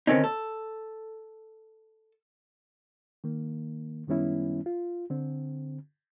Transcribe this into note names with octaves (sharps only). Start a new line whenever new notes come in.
D3 D#3 C4 C#4 D#4
A4
D#3 A#3
F#2 D#3 G3 B3 C#4 E4
F4
D3 C4